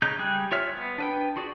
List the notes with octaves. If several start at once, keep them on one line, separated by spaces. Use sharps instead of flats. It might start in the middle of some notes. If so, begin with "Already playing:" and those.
C#3 G#3 D#4 G6
G3 G#4 G5 F#6
F4 C#5 E5 F6
B3
D4 B4 G5
F4 F#4 G#4 D5